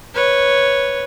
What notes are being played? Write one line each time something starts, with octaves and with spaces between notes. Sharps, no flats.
B4 C#5